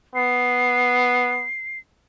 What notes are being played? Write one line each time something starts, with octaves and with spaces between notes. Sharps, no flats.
B3 C7